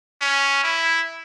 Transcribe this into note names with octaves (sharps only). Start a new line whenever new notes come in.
C#4
E4